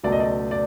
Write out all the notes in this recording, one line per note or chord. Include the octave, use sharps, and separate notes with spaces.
C#2 B2 F#3 A3 D5
D#5
D5
D5